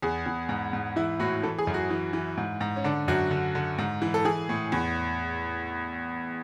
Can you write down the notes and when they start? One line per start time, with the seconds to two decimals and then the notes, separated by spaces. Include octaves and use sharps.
0.02 E2 G#4
0.26 E2
0.49 G#2
0.73 G#2
0.96 E3 E4
1.20 A2 F#4
1.43 E3 A4
1.58 G#4
1.67 F#2
1.74 F#4
1.90 E3
2.13 E3
2.37 G#2
2.60 G#2
2.76 C#4
2.84 D3 D4
3.08 F#2 F#4
3.31 D3
3.55 D3
3.78 G#2
4.02 E3
4.14 A4
4.25 E3 G#4
4.49 A2
4.72 E2